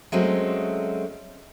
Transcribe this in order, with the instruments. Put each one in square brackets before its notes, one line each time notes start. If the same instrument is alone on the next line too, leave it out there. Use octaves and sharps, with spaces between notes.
[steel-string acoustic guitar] F#3 G#3 A3 C4 C#4